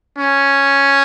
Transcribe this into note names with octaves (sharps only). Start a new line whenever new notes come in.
C#4